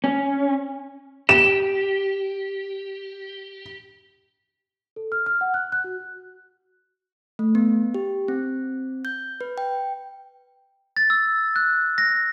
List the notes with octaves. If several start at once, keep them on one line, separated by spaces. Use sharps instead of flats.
C#4
G4 E7
A4
F6
F6
F#5
F#6
F#6
F#4
A3
B3
G4
C4
G6
B4
G5
A6
E6
F#6
A#6